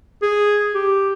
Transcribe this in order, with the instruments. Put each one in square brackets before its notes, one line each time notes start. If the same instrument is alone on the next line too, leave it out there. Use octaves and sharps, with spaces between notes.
[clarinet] G#4
G4